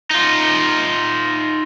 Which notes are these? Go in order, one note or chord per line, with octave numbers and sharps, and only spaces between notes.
D#4 F4